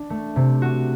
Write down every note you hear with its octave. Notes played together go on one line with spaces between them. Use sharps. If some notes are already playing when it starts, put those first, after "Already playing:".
Already playing: D4
A3
C3
F#4